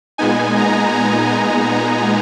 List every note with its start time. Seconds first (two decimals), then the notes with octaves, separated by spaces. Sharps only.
0.18 A#2 G#3 B3 D#4 G#5
0.58 A#5
0.97 A#5
1.36 G#5
1.75 A#5